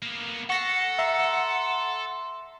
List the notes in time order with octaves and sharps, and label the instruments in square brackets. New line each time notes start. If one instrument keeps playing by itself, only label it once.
[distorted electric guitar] A#3 B3
[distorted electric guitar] A4 [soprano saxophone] F#5 [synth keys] C#6 A#6 C7
[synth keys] E5 A#5 C6